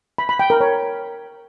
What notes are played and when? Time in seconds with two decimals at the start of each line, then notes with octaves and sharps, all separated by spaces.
0.18 B5
0.29 B5
0.39 G5
0.50 A#4
0.60 C#5